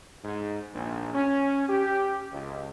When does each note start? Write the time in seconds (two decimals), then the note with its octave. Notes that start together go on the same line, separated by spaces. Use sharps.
0.24 G#2
0.74 A#1
1.14 C#4
1.69 G4
2.32 C#2